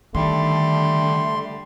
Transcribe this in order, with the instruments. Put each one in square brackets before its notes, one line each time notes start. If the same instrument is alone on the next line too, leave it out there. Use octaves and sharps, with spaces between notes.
[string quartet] D3 G3 [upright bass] D#3 [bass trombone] A3 [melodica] C6